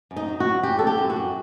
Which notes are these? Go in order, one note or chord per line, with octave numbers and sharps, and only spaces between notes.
F#2
D#4
F#3
F#4
F#3
F#2 G4
D3 A4
G4
F#2
F#4
F#2